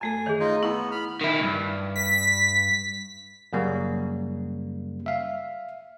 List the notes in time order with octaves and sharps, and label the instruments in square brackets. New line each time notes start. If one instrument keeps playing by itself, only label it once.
[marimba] F#2 A3 A4 [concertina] G#5
[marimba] D#3 E3 [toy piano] G#4 C#5
[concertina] D#4 F4 D#5
[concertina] B3 [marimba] E4 [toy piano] A#5 C#6
[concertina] B5 F6
[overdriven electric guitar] D#3 E4
D2 G2
[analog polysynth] B6
[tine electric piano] F#2 C#3 G3 A#3
E5 F5